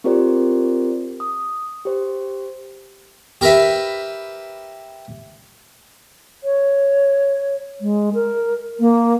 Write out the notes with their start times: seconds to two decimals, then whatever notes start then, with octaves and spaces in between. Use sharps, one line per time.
0.04 C4 F4 G4 A#4 C5 D5
1.20 D#6
1.85 G4 C5
3.41 G4 A#4 B4 E5
6.44 C#5
7.81 G#3
8.14 A#4
8.80 A#3